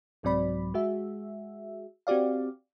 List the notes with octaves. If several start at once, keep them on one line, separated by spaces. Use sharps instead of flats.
C2 G#2 F#3 C4 D5 B5
G#3 F#4 G#4 E5
C4 F#4 G4 D5 F5